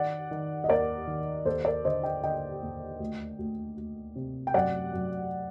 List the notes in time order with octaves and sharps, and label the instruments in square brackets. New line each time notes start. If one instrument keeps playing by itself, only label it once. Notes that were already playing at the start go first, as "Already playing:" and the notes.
Already playing: [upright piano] D#3 D5 F#5
D#3
D#5
D#2 A#4 D5
D#3
D#2 A4 C5
A#4 D5
D3 C5 D#5
D#5 G5
D3 D#5 G5
D#2
D2
D2
D2
C3
G5
F#2 D5 F#5
F#2